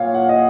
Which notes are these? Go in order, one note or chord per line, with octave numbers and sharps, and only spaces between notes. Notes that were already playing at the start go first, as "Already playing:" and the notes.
Already playing: A#2 C#5 F5
F#5
D#5